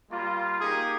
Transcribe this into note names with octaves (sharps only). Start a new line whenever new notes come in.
G3 A#3 F4
A#3 D#4 G4 G#4